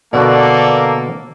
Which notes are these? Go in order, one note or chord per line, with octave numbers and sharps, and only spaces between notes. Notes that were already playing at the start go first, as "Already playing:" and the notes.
B2 D3 A#3 F#4 A4 D5